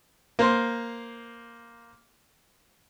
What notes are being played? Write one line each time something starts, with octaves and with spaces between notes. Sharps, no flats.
A#3 C5 C6